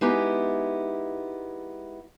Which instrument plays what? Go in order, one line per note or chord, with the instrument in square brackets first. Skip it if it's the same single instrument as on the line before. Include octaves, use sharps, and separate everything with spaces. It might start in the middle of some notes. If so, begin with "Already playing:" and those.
[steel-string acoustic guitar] G#3 B3 D#4 E4 G4